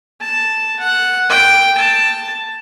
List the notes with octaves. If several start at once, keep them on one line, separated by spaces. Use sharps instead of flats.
A5
F#5
G5
A5